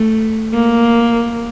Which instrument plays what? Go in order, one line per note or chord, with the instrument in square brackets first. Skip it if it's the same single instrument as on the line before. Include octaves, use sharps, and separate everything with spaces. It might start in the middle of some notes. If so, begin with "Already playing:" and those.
Already playing: [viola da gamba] A3
A#3